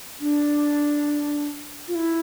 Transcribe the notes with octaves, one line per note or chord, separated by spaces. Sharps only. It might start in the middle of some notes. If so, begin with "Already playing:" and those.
D4
F4
E4